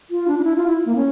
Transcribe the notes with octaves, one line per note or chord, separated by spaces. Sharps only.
F4
D4
D4
E4
F4
E4
A#3
C#4